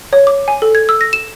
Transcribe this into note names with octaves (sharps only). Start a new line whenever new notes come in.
C#5
D6
G#5
A4
G#6
E6
A#6
E7